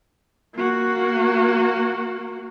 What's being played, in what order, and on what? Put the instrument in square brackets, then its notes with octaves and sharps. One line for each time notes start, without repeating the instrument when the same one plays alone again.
[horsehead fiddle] A#3 F#4